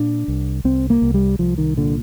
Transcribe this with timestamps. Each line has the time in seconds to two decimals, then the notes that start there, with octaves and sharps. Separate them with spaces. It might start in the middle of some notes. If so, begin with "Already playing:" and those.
Already playing: A#2 D4
0.28 C2
0.64 C2 C4
0.90 A#3
1.02 C2
1.14 G3
1.39 C2 F3
1.58 D#3
1.77 A#2 D3